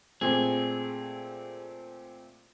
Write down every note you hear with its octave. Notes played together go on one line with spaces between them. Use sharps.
A#2 A3 C4 G#4